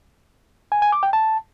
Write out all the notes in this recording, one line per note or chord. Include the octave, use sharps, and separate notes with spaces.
G#5
G#5
D6
G5
A5